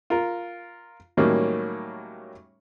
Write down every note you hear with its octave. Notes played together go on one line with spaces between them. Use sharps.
F4 A#4
A2 D#3 F#3 G3 A#3 C#4